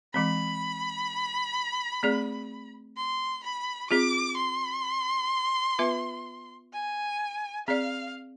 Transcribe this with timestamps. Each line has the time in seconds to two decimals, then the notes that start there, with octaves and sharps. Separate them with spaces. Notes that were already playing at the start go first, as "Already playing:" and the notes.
0.14 E3 G#3 C4 B5
2.03 A3 C4 G#4 D5
2.97 C6
3.44 B5
3.91 C4 F4 G#4 D6
4.38 C6
5.79 B3 F4 B4 E5
6.74 G#5
7.67 C4 G#4 D5 F5